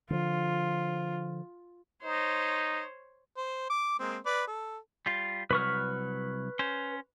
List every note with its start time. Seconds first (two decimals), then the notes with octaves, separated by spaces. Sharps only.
0.10 D3 F3 F4
2.04 D#4 C5 C#5
3.37 C5
3.69 D6
3.99 G#3 A#3 C4
4.26 B4 D5
4.47 A4
5.06 G3 F4
5.51 C2 F#3 B4 C#6 F6
6.59 C#4 C5